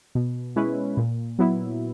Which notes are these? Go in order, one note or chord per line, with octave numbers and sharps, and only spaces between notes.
B2
G#3 C#4 E4 B4
A#2
F#3 B3 E4